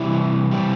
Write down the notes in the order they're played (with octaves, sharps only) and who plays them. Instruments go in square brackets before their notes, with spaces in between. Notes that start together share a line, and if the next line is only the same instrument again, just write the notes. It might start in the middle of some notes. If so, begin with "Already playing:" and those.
Already playing: [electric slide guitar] C3 E3 G3 [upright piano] E4
[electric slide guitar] C3 E3 G3